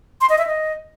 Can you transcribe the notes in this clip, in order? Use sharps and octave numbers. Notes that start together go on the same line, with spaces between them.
C6
D#5
E5
D#5